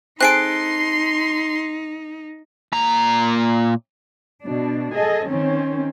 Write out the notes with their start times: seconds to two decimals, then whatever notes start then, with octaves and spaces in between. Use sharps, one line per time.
0.21 C4 D#4 G#4 A4 C6 F#6 C7 D7
2.73 A#2 A#5
4.44 B2 D4
4.95 G#4 A4 D#5
5.27 D#3 C4 C#4